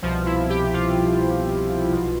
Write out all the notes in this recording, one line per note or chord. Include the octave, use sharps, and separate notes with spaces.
C2 B2 F3
E4
G4
F4
B1 B2